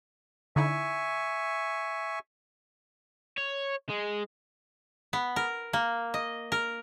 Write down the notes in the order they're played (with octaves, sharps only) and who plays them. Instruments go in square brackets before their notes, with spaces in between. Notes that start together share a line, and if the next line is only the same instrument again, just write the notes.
[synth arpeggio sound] D3 D#4 E4 [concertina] E5 G#5 C#6
[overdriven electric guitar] C#5
G#3
[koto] B3
A#4
A#3
D#5
A#4